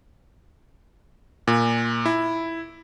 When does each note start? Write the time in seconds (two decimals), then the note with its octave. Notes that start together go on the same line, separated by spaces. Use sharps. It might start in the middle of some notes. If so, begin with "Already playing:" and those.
1.47 A#2
2.06 E4